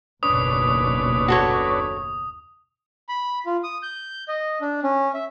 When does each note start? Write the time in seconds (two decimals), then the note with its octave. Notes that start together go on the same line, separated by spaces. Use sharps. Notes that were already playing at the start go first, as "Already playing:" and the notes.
0.23 F#1 D#2 B2 C#4 D4 B4 D#6
1.28 F#4 A4 C#5
3.09 B5
3.46 F4
3.63 D#6
3.83 G6
4.28 D#5
4.61 D4
4.83 C#4
5.14 E5